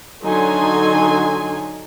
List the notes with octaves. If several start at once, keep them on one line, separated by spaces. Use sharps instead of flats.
D3 F#3 D#4 G#5 C6